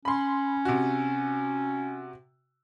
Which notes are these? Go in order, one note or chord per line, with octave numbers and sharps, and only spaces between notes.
C#4 B5 C6
C3 F#4